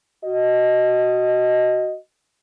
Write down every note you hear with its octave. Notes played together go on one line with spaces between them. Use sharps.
F#4 D#5